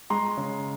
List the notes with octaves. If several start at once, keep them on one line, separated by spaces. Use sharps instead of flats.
G#3 A#5 C6
C#3